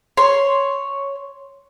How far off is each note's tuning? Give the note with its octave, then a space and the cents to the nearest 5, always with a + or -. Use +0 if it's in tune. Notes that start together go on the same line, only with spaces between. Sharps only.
C#5 +0 C6 +0